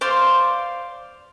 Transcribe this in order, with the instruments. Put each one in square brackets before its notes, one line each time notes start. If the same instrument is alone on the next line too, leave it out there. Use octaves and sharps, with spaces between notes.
[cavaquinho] C5 D5 F5 C6